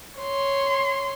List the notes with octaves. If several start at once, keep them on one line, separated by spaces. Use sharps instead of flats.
C#5 C6